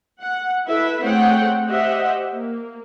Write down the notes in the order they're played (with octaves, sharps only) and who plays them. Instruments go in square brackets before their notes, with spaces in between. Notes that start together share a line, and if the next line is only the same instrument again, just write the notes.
[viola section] F#5
E4 A4 B4 E5
A3 C4 G#4 C#5 F#5 G5
G4 C5 D#5 E5 F#5
A#3